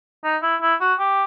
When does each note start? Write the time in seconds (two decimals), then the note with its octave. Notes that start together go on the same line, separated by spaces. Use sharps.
0.24 D#4
0.43 E4
0.62 E4
0.81 F#4
0.99 G4